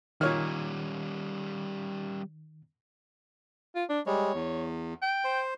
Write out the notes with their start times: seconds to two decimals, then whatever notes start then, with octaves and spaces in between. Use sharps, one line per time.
0.21 A#2 D#3 G3 C#4 C#5 F6
3.75 F4
3.90 D4
4.06 G3 G#3 C#5
4.34 E2
5.02 G5
5.24 C5